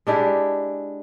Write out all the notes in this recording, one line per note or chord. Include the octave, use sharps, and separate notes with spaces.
G#3 D4 E4 G4